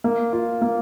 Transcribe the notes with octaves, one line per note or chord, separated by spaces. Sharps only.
A#3
F4
A#3